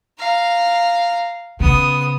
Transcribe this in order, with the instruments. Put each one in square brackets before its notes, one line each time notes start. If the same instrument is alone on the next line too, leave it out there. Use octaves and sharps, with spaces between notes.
[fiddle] F5 A#5
[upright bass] C#3 [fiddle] B3 D#6